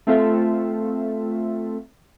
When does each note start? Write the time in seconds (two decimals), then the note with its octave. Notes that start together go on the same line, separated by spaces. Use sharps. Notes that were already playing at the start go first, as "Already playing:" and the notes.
0.07 A3 C4 F4 A4 E5